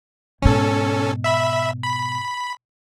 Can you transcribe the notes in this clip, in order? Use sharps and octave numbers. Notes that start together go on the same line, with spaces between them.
G#2 B2 C#4 A4
E5 B5
B5